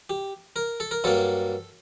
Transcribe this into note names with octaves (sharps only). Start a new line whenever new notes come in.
G4
A#4
A4
A#4
G2 F#3 A#3 A4